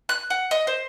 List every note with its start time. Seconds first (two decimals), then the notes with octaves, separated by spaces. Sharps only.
0.09 F#6
0.30 F#5
0.51 D#5
0.67 C5